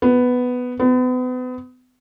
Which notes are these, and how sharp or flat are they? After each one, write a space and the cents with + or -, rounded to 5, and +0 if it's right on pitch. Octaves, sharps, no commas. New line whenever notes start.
B3 +5
B3 +35